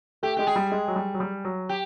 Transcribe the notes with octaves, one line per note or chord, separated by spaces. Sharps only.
A3 G4
G#3 G4
G#4
G3
G#3
F#3
G3
F#3
G3
F#3
G4